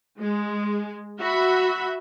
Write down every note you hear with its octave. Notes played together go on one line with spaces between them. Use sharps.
G#3
F#4 E5 B5